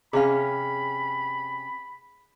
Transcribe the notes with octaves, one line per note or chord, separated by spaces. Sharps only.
C3 C#4 G#4 F5 B5